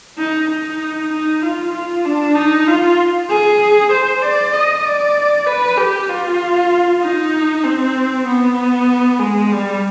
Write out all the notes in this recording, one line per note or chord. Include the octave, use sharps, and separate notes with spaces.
D#4
D#4
D#4
F4
F4
D4
D#4
F4
G#4
C5
D5
D#5
D5
B4
G4
F4
D#4
C4
B3
G#3
G3